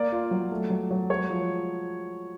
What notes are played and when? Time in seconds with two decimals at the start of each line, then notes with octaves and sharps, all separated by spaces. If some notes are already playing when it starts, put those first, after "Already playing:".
Already playing: A#3 D5
0.12 F4
0.31 F#3
0.51 A3
0.70 F#3
0.91 F#3
1.10 G#3 C#5
1.30 F3